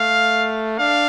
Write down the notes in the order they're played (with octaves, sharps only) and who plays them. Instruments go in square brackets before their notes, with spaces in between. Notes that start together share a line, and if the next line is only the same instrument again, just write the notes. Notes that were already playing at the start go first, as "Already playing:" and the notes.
Already playing: [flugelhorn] A3 [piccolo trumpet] F5
[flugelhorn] D4 [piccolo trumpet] F5